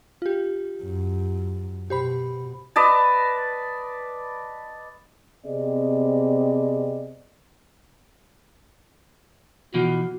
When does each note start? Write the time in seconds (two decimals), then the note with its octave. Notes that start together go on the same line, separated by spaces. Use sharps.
0.22 F4 G4
0.83 F#2
1.90 B2 G4 C5 B5
2.76 B4 D5 D#5 A5
5.45 C3 B3 C4 G#4 D5 D#5
9.74 B2 E3 F3 F#4